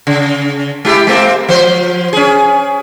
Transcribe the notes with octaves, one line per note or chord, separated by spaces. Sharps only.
C#3
G#3 E4 G4
G#3 A#3 C4
F3 C5
C#4 G#4